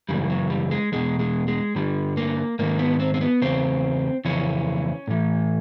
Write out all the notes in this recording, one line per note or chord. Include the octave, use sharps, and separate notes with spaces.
F#2 C#3 E3 G3
F#3
G3
G#3
E2 B2 G#3
G#3
G#3
G2 D3 G3
A#3
G#2 D#3 A#3
B3
C4
C4
B3
E2 C#3 C4
F2 C#3 E3 C#4
A2 E3